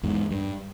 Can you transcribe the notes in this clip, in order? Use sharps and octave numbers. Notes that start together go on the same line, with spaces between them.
E2 G#2
G2